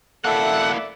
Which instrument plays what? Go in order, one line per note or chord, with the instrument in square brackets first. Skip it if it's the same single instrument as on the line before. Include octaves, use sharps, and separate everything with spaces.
[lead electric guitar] A#3 E4 [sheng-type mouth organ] A4 [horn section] D5 E5 [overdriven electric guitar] F#5